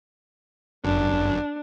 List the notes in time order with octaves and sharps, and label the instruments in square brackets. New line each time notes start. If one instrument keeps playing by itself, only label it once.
[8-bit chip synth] G1 F#2 [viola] D4